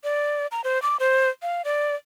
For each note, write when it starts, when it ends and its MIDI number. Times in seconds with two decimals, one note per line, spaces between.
0.04 0.47 74
0.52 0.61 82
0.64 0.81 72
0.82 0.97 86
1.00 1.29 72
1.42 1.62 77
1.65 1.95 74